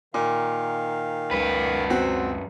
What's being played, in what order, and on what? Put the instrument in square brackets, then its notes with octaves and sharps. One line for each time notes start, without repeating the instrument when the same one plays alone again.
[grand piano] A#2 [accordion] D#3 F5
[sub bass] C#2 [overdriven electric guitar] F#2 B4
[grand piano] C4 F#4